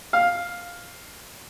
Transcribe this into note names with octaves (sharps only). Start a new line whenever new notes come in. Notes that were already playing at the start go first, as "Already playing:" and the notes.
F5